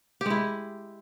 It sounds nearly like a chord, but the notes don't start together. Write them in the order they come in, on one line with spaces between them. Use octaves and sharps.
G4 G#3 E4